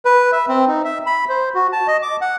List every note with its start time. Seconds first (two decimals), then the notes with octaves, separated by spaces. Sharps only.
0.05 B4
0.32 E5
0.48 C4
0.67 D#4
0.84 E5
1.06 B5
1.29 C5
1.54 F#4
1.73 A5
1.87 D#5
2.02 D6
2.21 F#5